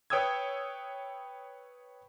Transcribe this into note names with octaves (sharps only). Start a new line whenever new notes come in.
B4 C#5 G5 D#6 E6 G#6